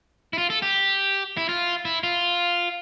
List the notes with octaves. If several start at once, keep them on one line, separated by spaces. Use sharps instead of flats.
E4
F4
A4
G4
E4
F4
E4
F4